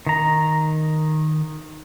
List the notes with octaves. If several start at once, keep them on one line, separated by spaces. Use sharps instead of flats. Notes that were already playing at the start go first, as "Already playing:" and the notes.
D#3 A#5